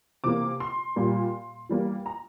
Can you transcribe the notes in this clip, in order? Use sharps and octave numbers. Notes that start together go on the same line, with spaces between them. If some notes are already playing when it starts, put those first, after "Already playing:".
C3 E3 A#3 D6
C6
A#2 G3 A#3
E3 G3 A#3
A#5